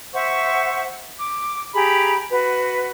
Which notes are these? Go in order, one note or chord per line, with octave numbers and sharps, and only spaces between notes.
C5 E5 F#5 C#6
D6
G4 G#4 A#5 B5
F#4 B4